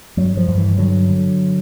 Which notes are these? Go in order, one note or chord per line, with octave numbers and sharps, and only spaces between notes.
G2 F#3
F3
G2
E3
D3 F#3
D3